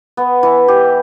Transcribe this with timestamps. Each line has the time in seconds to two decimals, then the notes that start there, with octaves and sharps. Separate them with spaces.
0.17 B3
0.43 E3
0.68 G4